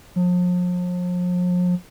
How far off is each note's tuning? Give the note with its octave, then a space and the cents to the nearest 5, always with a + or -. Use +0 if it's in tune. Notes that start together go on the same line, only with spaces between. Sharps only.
F3 +40